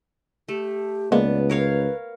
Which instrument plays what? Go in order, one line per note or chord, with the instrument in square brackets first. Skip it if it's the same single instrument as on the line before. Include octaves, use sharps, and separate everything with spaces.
[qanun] A3 [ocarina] G4
[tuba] C#2 [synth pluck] G#3 A#3 [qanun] B3 [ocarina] D5
[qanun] A#4 C#5 F5 [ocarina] B4